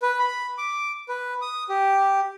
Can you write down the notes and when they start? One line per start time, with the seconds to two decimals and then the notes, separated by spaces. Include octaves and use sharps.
0.02 B4
0.19 B5
0.58 D6
1.09 B4
1.42 D#6
1.69 G4